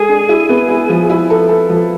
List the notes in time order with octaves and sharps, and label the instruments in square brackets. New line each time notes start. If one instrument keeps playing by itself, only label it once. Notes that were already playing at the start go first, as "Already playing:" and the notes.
Already playing: [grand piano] G#3 A4 [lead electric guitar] G#4
[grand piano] D4
E4
B3
E4
F3
E4
A4
A4
F3